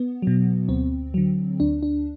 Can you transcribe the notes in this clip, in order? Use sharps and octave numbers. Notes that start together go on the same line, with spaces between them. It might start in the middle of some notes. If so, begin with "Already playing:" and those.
Already playing: B3
B2 F#3
D2 C4
D3 F#3
D2 D4
D4